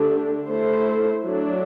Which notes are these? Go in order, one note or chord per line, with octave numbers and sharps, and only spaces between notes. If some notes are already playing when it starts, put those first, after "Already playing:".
Already playing: D3 A3 D4 G4
A3 E4 A4 C5
F#3 A3 D4